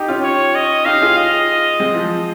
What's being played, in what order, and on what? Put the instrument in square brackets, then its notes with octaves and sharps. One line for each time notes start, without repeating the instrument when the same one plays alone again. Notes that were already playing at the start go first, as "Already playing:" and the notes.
Already playing: [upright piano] D#4 G4
C#4 F4
[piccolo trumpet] C#5
D#5
[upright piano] D#4 G4 [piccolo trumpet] F5
[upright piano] F4 G#4
[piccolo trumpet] D#5
[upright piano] G#3 C4
F3